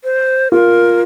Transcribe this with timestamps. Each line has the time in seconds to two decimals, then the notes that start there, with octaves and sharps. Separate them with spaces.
0.04 C5
0.51 F4 A#4